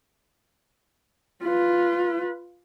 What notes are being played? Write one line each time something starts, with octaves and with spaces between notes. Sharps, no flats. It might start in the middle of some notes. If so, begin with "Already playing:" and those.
F4 B4